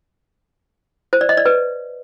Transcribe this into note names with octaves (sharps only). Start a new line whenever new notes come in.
C5
D5
D#5
D5
B4